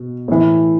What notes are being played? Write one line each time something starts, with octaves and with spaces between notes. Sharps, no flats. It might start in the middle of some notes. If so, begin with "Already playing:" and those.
Already playing: B2
A2 E3